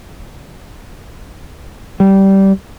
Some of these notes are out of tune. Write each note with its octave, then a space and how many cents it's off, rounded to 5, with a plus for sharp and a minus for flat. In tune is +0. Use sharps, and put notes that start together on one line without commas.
G3 -15